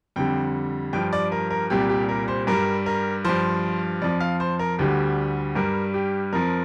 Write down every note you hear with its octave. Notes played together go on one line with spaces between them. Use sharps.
F2 D3 G3 G5
G2 F3 G5
D5
A#4
A#4
C2 A#2 G3 G4
G4
A#4
C5
G2 G3 A#4
A#4
G2 F3 C5
F2 F3 D5
F5
C5
A#4
D2 D3 G3 G4
G2 G3 A#4
G4
F2 F3 A#4